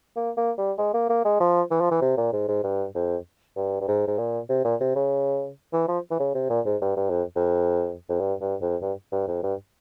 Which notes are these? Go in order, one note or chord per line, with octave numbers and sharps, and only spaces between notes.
A#3
A#3
G3
G#3
A#3
A#3
G#3
F3
E3
F3
E3
C3
A#2
G#2
G#2
G2
F2
G2
G2
G#2
G#2
A#2
C3
A#2
C3
C#3
E3
F3
E3
C#3
C3
A#2
G#2
G2
G2
F2
F2
F2
G2
G2
F2
G2
G2
F2
G2